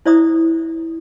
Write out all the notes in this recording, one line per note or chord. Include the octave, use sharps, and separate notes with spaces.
E4 C5 D5 E5 A#5 D#6